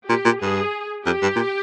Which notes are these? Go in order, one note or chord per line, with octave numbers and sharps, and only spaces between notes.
A#2 G4
A#2
G2 G#4
F2 G4
G2
A#2